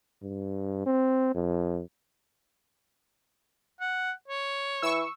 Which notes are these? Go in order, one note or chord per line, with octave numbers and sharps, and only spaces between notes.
G2
C4
F2
F#5
C#5
E3 C#6 E6